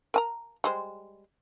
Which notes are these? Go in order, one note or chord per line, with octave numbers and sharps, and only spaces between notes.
A#4 G#5 A#5
G3 G#3 C5